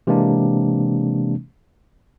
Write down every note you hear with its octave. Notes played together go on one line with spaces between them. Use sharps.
C3 E3 G#3 A#3 C4 D4